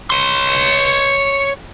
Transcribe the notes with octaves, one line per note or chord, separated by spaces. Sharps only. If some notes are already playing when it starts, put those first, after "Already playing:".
C#5 C6